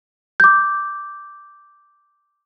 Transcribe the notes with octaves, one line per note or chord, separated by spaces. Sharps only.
D6 G6